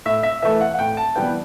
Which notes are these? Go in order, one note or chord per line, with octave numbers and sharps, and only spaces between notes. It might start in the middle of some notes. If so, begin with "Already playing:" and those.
A2 E5
E5
E3 A3 E5
F#5
F#5
A2 G5
A5
E3 G3 B3 G5